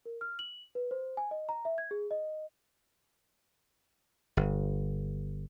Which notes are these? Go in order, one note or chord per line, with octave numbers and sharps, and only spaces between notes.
A#4
F6
F#7
B4
C5
G#5
D#5
A#5
E5
G#6
G#4
D#5
G1